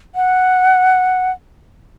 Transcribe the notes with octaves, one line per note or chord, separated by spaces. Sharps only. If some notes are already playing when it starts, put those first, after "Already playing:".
F#5